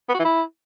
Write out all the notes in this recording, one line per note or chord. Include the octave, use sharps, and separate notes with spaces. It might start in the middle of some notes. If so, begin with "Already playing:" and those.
B3
F#4
E3
E4